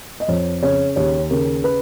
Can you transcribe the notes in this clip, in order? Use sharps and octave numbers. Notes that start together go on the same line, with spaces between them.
D#5
F2 C#5
C#3 C#5
D#2 C#5
C#3 A#4
B4